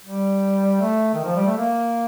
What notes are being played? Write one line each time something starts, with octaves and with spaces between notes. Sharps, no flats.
G3
A3
D#3
F3
G3
A3
A#3